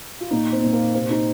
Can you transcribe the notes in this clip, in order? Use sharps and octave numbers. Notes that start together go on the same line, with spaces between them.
F4
A#2 D#4
C4
A#2
A#3
C3 C4
D#4